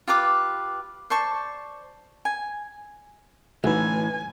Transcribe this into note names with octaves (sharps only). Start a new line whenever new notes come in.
F4 G4 B4 D6
C5 D5 A5 C#6
G#5
D2 A2 E3 D#4 B4 G#5